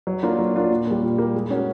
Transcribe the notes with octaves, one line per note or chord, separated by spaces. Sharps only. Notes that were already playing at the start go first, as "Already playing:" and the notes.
F#3
A#3 D4 F4 A#4
F#3
A#3 D4 F4 A#4
A#2
G3 A#3
A#2
G3 A#3
G#3
C#4 F#4 A#4